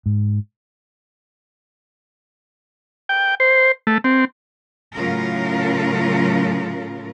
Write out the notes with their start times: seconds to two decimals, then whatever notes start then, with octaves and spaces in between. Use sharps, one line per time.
0.06 G#2
3.09 G5
3.40 C5
3.87 A3
4.04 C4
4.95 A2 C#3 F#3 C#4 F4 A#4